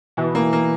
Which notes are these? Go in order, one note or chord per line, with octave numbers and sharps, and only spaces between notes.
B2 E3
A#3
A#3